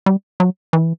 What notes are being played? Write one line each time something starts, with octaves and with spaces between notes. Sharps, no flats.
G3
F#3
E3